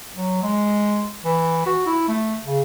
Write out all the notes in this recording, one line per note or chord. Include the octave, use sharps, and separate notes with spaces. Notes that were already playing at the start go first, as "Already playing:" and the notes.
F#3
G#3
E3
F#4
E4
A3
C#3